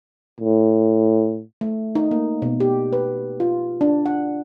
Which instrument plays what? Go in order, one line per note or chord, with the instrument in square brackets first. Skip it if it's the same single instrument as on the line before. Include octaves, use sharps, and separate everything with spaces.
[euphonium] A2
[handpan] A3
D#4
A#3
B2
G4
B4
F4
D4
F#5